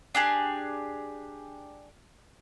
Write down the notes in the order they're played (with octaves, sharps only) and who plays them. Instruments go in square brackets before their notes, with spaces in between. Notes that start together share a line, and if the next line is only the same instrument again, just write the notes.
[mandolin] D4 G4 G#4